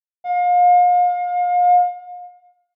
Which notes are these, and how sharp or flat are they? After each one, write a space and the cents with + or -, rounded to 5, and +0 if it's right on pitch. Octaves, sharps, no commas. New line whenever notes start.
F5 +35